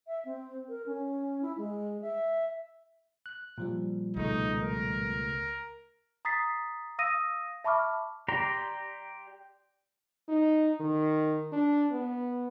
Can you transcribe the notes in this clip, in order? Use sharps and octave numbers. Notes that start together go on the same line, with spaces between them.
E5
C4
A#4
C#4
E4
G#3
E5
F#6
A#2 F3 G3
C#2 B2 A3 D#4
A#4
A#5 D#6 A6 B6 C7
F5 D#6 E6 A#6 D#7
E5 A5 B5 C#6 D6 F6
G4 D5 A#5 C6
D#4
D#3
D4
B3